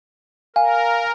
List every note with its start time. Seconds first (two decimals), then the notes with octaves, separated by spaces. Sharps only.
0.56 A#4 F5 G#5